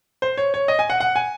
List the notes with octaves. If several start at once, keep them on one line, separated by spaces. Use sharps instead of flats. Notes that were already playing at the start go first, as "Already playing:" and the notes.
C5
C#5
C#5
D#5
G#5
F#5
F#5
G#5